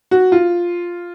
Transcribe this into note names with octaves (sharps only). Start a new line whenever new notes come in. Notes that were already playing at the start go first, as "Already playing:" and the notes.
F#4
F4